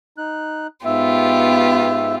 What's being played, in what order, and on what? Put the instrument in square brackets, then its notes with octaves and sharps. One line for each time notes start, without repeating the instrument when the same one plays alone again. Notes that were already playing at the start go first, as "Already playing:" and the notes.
[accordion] D#4 F#6
[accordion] G#2 E5 [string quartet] B3 F4 G4